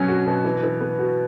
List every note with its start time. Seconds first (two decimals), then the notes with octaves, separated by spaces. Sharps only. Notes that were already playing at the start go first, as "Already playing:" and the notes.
Already playing: B2 F#3 C#4
0.08 F#4
0.27 B2
0.44 E3
0.63 E3
0.81 B3
0.99 F#4